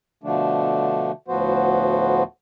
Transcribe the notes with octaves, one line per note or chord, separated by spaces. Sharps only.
B2 D3 F3 A3 D4
D2 A2 F3 B3 F#4 C5